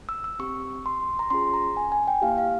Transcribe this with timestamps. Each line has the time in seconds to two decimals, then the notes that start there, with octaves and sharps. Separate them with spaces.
0.09 E6
0.24 E6
0.39 C4 G4 C#6
0.86 C6
1.19 A#5
1.30 C#4 F4 G#4 C6
1.54 A#5
1.77 G#5
1.92 G#5
2.08 G5
2.22 A#3 E4 G4 F5
2.38 F5